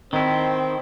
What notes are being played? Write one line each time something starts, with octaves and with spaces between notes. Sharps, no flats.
D#3 C4 E4